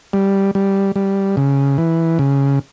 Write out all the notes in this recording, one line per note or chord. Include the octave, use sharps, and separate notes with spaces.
G3
G3
G3
C#3
E3
C#3